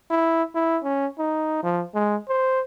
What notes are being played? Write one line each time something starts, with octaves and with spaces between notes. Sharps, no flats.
E4
E4
C#4
D#4
F3
G#3
C5